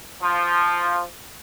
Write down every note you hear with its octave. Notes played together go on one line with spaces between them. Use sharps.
F3